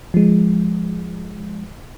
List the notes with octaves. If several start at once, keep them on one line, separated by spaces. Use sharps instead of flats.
F3 G#3